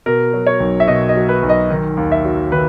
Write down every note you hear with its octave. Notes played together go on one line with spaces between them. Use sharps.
B2 A#4
F#3
C#5
B1
E5
B2 D#5
D#5
F#3
B4
B1
D#5
D#3
D#2
E5
F#3
D#3 B4